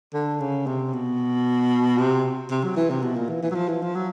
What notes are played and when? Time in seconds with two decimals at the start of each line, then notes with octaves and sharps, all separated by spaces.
0.14 D3
0.40 C#3
0.67 C3
0.93 B2
1.98 C3
2.51 C3
2.64 F#3
2.77 E3
2.90 C3
3.02 B2
3.16 A#2
3.29 E3
3.43 E3
3.51 F#3
3.55 F3
3.68 E3
3.82 F3
3.95 F#3